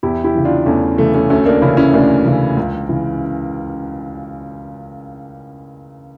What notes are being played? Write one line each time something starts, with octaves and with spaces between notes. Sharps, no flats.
E2 E4 G4
E4 G4
C#3 E3
D4 F4
E2 A3 C#4
C#3 E3 A3
A3 C#4
D2 A3 C#4
A#3 D4
C#3 E3 C#4 E4
C#4 E4
D2 A#3 D4
C#3 E3
C#2
C#3 E3